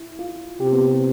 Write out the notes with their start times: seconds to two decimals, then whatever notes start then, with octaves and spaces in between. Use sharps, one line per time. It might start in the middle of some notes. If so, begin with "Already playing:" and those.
Already playing: E4
0.19 F4
0.60 C3 G4
0.73 B3
0.81 C4